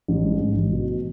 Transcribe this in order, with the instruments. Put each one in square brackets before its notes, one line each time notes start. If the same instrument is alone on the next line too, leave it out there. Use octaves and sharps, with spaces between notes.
[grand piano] A1
G#2
A1
A1
B2